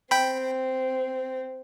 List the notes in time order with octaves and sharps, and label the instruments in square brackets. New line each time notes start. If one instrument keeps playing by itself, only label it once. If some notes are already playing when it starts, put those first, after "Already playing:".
[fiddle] C4 [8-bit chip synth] G5 B5